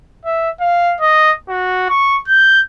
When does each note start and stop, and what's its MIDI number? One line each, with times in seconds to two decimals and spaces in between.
0.25 0.50 76
0.60 0.95 77
1.00 1.32 75
1.48 1.88 66
1.89 2.18 85
2.27 2.61 91